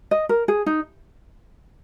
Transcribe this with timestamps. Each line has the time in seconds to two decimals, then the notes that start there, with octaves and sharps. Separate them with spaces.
0.11 D#5
0.29 A#4
0.48 G#4
0.66 D#4